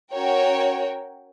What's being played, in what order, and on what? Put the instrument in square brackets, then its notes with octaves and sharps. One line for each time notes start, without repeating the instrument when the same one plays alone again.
[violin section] C#4 F#4 A#4 C#5 G5